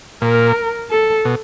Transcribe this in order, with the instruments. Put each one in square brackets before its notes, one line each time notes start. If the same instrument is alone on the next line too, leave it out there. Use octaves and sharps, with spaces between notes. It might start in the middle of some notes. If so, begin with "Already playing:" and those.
[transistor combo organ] A#2 [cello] A#4
[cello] A4
[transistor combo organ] B2